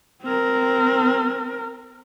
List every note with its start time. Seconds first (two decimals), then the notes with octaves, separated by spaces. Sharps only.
0.23 C4 A#4